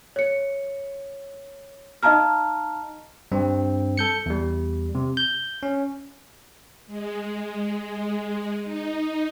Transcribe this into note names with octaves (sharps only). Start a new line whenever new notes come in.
C#5 C#7
D#4 D#5 F5 A5 A#5 F6
G2 C4
A4 G6 C#7
E2 G3
C3
G6
C#4
G#3
D#4